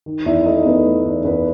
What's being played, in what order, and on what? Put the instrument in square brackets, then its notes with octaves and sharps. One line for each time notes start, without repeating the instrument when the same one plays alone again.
[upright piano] D#3
E2 E4 E5
A3 D#4 D#5
A3 B3 B4
A3
E2
E2 B3 B4